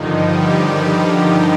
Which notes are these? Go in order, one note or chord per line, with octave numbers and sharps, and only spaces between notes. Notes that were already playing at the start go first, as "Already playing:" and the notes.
Already playing: G2 D3 D#3 F3 D#4
G3 G4
G3 G4